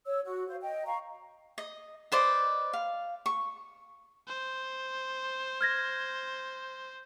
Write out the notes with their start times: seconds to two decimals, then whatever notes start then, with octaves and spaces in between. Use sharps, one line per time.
0.06 C#5 E6
0.25 F#4
0.48 C5 F5
0.61 D#5 G5
0.85 F5 G5 A#5 C#6
1.58 D#5
2.12 B4 C5 D5 D#5
2.73 F5
3.26 C#6
4.28 C5
5.61 F6 G#6 A#6